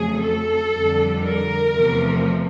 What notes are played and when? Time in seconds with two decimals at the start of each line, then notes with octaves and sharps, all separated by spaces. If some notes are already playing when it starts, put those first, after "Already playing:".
Already playing: F2 C#3 F#3 A3 G#4
0.23 A4
0.73 F2 D3 G3
1.23 A#4
1.73 E2 C3 F3 A3